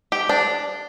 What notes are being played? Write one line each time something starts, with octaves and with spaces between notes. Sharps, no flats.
G4
D4